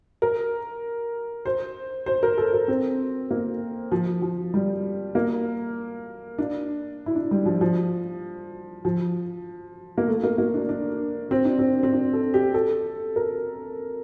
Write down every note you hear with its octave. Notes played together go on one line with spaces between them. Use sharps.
A#4
C5
C5
A#4
A4
A#4
C4
A#3
F3
F3
G3
A#3
D4
E4
D4
G3
F3
F3
F3
A#3
A3
A#3
A#3
D4
D4
C4
D4
C4
C4
D4
A4
G4
A4
A#4